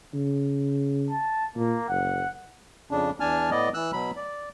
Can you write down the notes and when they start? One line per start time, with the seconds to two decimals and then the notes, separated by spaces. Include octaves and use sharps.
0.14 C#3
1.11 A5
1.56 A#2 A#3
1.89 F#1 F#5
2.91 F2 C#3 D4
3.20 E2 D4 G#5 A5 F6
3.51 A2 B3 D5 D#5
3.74 E3 E6 F#6
3.93 B2 F#3 B5
4.16 D5